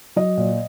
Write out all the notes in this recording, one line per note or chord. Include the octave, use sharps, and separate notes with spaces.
F#3 D#5
A#2